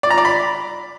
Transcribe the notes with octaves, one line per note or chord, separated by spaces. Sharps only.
D5
A#5
D5
B5